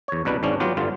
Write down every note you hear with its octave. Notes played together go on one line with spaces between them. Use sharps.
E2 C#5
C2 B2 D4 B4
G#1 G#2 C#4 D4
F#3 B3 F4 G4
G1 G2 D3 F4